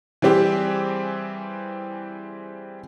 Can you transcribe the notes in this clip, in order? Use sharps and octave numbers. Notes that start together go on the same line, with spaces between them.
E3 G3 C4 G4 G#4